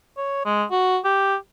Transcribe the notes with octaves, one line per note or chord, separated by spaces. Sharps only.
C#5
G#3
F#4
G4